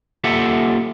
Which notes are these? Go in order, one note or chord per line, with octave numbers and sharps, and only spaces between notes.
A#3 F4 G4 A4 E5 F#5